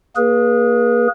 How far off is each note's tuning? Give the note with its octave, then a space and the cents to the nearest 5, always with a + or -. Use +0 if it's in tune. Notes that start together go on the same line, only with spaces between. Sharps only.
A#3 +5 G#4 +0 B4 -35